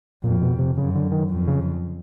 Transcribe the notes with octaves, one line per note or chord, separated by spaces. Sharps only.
F2 A#2
B2
C3
F#2 C#3
D3
D#3
F2
C#3